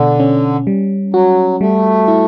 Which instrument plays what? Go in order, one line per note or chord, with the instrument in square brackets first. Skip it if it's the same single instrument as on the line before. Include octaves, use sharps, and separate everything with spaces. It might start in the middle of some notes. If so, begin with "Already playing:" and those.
Already playing: [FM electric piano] B2 [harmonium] D3
[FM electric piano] C#4
G3
[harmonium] F#3 [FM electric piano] F#4
[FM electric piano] G3 [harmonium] A3
[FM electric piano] E4